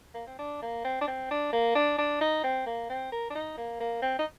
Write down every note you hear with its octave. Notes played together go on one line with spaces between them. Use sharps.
A#3
C4
D4
A#3
C4
D4
C4
D4
A#3
D4
D4
D#4
C4
A#3
C4
A#4
D4
D#4
A#3
A#3
C4
D#4